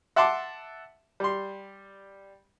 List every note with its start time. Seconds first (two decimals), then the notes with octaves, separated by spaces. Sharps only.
0.16 E5 F#5 A5 C6 D6
1.20 G3 C6